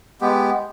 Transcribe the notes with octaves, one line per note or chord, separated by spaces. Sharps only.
G#3 B3 G4